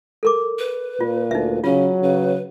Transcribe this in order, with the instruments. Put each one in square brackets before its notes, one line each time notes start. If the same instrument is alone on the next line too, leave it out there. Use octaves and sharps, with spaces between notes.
[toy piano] A4 A#4 D6
[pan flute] B4
[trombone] A#2 [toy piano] F4
[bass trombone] D2 [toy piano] D#4 E5
[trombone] C#3 [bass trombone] F#3 [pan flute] C#4 [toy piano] F4
[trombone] C#3 [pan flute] B4